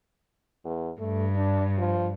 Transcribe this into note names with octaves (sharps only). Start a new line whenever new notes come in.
E2
G2 A3
D4
F3